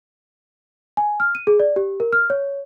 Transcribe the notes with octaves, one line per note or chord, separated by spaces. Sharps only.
G#5
F6
D#7
G#4
D5
G4
A#4
F6
C#5